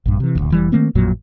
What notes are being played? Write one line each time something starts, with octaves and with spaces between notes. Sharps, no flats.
A#1 G2
C3 E3
D1 G1 D2
F1 E3 G3
D#3 A3 A#3 C4
A1 F2 A#2 F#3